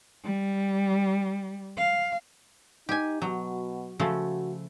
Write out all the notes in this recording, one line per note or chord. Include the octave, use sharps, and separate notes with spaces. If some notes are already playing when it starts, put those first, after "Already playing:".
G3
F5
D#4 G4 G#5
B2 F#3
C#3 F3 A3 F#4